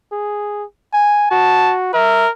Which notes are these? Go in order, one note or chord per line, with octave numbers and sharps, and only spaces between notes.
G#4
G#5
F#4 A5
A#4 E5